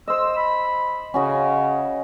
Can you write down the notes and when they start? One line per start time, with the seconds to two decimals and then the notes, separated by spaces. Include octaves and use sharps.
0.08 C5 D#5 E6
0.36 B5
1.14 C#3 C#4 F#4 D#5